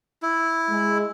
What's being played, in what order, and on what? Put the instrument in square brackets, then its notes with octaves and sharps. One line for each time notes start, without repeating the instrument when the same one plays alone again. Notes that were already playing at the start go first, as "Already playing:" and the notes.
[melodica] E4
[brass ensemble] G#3